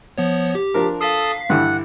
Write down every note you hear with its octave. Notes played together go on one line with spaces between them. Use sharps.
F3 B3 C#5
G4
F3 D4 A#4
A4 F5 D#6 E6 B6 C7
G2 D3 E3 F#5